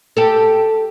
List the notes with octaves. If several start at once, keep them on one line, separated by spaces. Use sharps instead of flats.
G4 A4